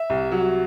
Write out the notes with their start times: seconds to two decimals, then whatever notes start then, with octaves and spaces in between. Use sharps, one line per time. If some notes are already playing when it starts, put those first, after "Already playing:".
Already playing: E5
0.10 C2
0.32 F#3